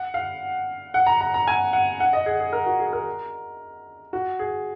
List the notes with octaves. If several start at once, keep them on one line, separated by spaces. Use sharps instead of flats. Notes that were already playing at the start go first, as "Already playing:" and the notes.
Already playing: F#5
F5
F#5
A#5
A#5
A#5
G#5
F#5
F#5
D#5
G#4
G#4
A#4
F#4
G#4
A#4
F#4
G#4